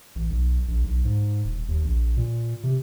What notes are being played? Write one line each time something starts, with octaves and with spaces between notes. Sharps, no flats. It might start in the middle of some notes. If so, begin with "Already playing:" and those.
A1
B1
A#1
B1
G#2
D#1
D#2
A#1
A#2
C3